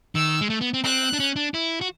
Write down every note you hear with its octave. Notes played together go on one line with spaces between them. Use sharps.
D#3 E6
G#3
A3
B3
C4
C4 F#6
D4
C#4
D4
E4
F#4